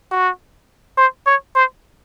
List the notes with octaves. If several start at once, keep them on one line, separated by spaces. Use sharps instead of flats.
F#4
C5
C#5
C5